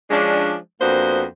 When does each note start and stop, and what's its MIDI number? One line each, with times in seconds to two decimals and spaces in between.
0.10 0.55 53
0.10 0.55 56
0.10 0.55 61
0.10 0.55 62
0.81 1.24 41
0.81 1.24 58
0.81 1.24 59
0.81 1.24 62
0.81 1.24 66
0.81 1.24 72